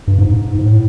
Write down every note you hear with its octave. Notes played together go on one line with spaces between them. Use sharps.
G2
G#2
G#2
A2